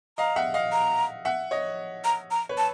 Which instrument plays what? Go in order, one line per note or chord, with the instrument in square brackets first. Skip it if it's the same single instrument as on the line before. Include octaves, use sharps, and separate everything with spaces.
[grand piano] D#5 F5 [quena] A#5
[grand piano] E5 F#5
D#5 F5
[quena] A#5
[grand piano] E5 F#5
C#5 D#5
[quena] A#5
A#5
[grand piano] B4 C#5
[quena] A5